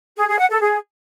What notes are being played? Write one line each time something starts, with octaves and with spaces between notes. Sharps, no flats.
G#4
G#4
F#5
A4
G#4